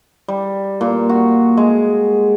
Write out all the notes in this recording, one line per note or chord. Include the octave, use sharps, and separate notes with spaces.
G3
A#2
F#4
G#3